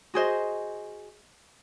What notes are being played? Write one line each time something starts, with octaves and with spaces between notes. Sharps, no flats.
F#4 G#4 C5 D#5